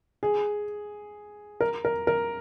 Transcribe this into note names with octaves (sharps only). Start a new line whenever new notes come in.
G#4
A#4
A#4
A#4